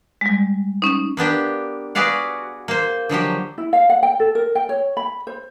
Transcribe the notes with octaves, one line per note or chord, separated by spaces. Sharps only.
G3 G#3
C#4 D#4
A#3 B3 D4 G4
F#4 G#4 B4 D5 F5 F#5
A#3 C5
D3 F3 F#3 G4
E4
F5
F#5
G5
A4
A#4
G5
C#5
B5
C5